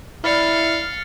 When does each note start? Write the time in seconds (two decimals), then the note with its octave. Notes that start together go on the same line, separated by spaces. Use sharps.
0.24 E4 D5 F5 B5 F6 A6 C#7